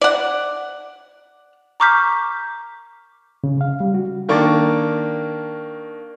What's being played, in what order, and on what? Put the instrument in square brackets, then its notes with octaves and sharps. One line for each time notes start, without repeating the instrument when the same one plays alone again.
[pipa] D5 F#5
[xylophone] A#5 C#6 D6 F6 G6 B6
[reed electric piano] C#3
F5
G3
F#4
[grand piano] D#3 A#3 D4 C#6 D6 A6